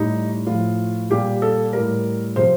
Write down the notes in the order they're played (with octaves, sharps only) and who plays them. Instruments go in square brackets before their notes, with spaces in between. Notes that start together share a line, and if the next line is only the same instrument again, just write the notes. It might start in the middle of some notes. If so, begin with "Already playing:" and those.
Already playing: [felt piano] A2 G3 D#4
A2 F3 F4
A#2 G3 G4
A4
A2 G3 A#4
C3 F3 C5